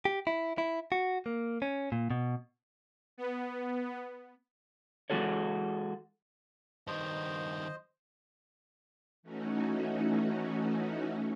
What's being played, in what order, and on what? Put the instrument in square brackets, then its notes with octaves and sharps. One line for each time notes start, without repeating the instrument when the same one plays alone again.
[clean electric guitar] G4
E4
E4
F#4
A#3
C#4
A#2
B2
[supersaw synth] B3
[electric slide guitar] E3 G#3 F#4 A4 C#5
[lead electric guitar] G2 D#3 [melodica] C5 D#5
[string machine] E3 A3 C#4 D#4 F#4